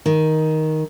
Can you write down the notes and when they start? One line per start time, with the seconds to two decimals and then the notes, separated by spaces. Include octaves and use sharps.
0.06 D#3